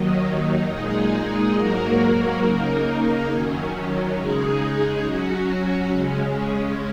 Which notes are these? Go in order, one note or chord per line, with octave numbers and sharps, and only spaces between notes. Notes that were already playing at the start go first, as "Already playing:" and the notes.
Already playing: D#2 D#3 F#3 D#4
A#2 G#3 D#4 G#4
G#2 F#3 A#3 F#4 A#4
C#3 A#3 D#4 A#4
F#2 D#3 F#3 C#4
C#3 G#3 D#4 G#4
F#3 C#4 F#4
C#3 G#3 C#4